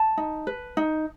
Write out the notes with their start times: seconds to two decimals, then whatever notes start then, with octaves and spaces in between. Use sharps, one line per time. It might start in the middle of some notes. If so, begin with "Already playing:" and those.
Already playing: A5
0.17 D#4
0.47 B4
0.77 D#4